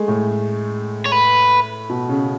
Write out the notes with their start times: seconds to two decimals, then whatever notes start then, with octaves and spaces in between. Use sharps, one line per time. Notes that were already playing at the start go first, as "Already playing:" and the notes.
Already playing: G#3 A3
0.08 A2
1.06 C#5
1.12 B4
1.89 B2
2.09 C#3